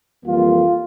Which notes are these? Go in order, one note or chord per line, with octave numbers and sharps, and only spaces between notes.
F2 E3 G3 A#3 F4